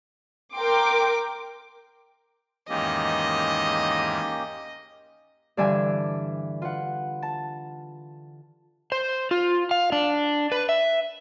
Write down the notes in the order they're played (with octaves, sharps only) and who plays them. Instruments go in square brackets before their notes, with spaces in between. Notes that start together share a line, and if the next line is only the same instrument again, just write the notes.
[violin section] A#4 G5 C6 D6
[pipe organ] E2 G#2 D#3 [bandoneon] A#3 C#4 G4 [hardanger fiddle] D#5
[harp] G2 D3 E3 D5 E5 G#5
F4 B4 F#5
A5
[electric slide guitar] C5
F4
F5
D4
B4
E5